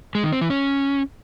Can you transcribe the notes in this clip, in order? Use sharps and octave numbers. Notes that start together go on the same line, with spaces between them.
G#3
D#3
C4
E3
C#4